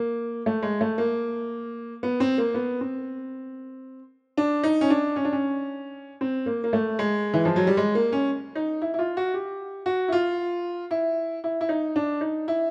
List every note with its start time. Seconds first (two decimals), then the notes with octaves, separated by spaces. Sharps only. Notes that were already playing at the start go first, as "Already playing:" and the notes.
Already playing: A#3
0.46 A3
0.62 G#3
0.81 A3
0.98 A#3
2.03 B3
2.20 C4
2.38 A#3
2.54 B3
2.81 C4
4.37 D4
4.63 D#4
4.81 C#4
4.90 D4
5.16 C#4
5.25 D4
5.32 C#4
6.21 C4
6.46 A#3
6.64 A#3
6.73 A3
6.99 G#3
7.34 E3
7.45 F3
7.56 F#3
7.67 G3
7.77 G#3
7.95 A#3
8.12 C#4
8.55 D#4
8.82 E4
8.94 E4
8.99 F4
9.17 F#4
9.34 G4
9.86 F#4
10.08 E4
10.12 F4
10.91 E4
11.44 E4
11.61 E4
11.69 D#4
11.96 D4
12.21 D#4
12.48 E4